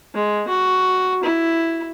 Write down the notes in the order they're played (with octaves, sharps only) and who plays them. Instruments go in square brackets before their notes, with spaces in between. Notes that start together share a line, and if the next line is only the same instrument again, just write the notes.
[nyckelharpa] G#3
F#4
E4